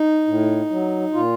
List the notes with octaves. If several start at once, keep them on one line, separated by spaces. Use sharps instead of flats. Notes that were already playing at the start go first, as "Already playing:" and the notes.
Already playing: D#4
A2
F#3
A#2 F4